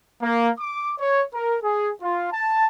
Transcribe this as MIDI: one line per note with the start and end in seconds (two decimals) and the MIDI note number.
0.22 0.50 58
0.58 0.93 86
0.99 1.23 73
1.33 1.58 70
1.62 1.90 68
2.02 2.30 65
2.32 2.66 81